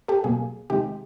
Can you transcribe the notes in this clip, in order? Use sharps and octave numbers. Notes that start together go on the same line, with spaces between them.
G4 A4
B2 F#3 A#3 G#4
C3 D#3 G#3 G4